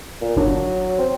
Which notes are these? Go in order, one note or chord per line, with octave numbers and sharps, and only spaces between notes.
A#2
G1 F#3 D4
C4